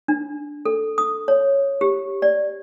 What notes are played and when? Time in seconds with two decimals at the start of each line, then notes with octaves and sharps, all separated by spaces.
0.08 D4
0.65 A4
0.98 D#6
1.28 C#5
1.81 G4
2.22 D5